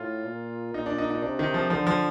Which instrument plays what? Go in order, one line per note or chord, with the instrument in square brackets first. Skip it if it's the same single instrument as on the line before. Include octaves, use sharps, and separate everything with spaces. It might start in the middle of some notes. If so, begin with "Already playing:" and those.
Already playing: [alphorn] A2 [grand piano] F4
[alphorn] A#2
[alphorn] A#2 [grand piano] D#4
[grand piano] D4
D#4
D#4
[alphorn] C3 [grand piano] D4
[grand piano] D#3
F3
[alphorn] D3 [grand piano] F3
[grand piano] F3